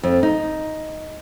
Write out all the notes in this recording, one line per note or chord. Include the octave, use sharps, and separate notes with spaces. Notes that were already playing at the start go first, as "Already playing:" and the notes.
F2
D#4